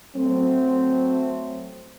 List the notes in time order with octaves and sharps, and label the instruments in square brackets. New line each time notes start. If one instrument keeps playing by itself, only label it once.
[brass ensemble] F#3 A3 C4